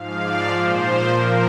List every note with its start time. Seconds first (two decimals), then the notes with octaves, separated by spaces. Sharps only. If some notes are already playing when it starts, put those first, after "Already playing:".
Already playing: G#2 F3 F5
0.19 D5
0.48 A#2 F3 C5
1.08 A#2 F3 A#4